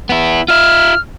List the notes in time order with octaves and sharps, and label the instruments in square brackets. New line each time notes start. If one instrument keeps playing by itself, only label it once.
[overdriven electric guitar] B3 E4
[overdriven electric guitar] F4 E5 [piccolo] F6